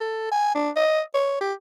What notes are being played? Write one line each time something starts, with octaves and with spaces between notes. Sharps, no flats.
A4
G#5
D4
D#5
C#5
G4